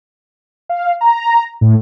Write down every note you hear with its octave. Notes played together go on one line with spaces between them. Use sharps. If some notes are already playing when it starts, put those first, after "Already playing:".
F5
A#5
A2